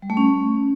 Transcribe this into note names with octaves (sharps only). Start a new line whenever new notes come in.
G3
A3
C#4